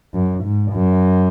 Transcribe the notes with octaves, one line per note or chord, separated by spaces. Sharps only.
F#2
G#2
F#2